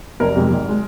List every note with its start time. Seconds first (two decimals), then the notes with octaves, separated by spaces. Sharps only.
0.20 F1 A#4
0.35 F2 C3 G#3
0.51 G#1
0.69 G#3